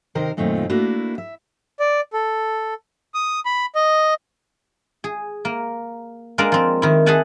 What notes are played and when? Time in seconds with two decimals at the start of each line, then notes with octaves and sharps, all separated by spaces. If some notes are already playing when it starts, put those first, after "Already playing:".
0.15 C3 D#3 A#4 C5
0.37 F#2 A#2 D#3 A3 C4 F4
0.70 A3 A#3 D4 E4 F#4
1.18 E5
1.80 D5
2.13 A4
3.14 D#6
3.45 B5
3.75 D#5
5.04 G#4
5.45 A#3
6.38 G#3 A#3 D4 D5 F5
6.52 F3 C4
6.82 D#3 E4
7.06 G#4 A4 E5 F#5 G#5 A5